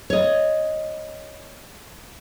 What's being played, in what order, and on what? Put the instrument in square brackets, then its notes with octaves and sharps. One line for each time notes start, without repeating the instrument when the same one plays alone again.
[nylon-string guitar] C#5 D#5